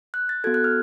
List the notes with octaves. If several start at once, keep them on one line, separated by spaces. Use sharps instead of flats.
F#6
A6
B3 F#4 A4 G#6
F#6
F6